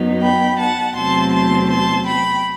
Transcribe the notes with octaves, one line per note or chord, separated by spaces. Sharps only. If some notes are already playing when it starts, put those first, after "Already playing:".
Already playing: F#2 F#3 B3 D#4
G5 B5
F#5 A5
E2 C3 F#3 A3 C4 A5 C6
A5 C6
A5 C6
G5 B5